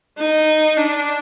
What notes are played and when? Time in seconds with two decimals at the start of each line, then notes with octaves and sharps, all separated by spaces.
0.18 D#4
0.77 D4